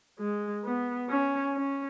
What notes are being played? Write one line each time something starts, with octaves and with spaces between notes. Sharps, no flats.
G#3
B3
C#4
C#4